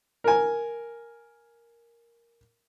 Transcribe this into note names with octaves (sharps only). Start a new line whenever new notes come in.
A#4 G#5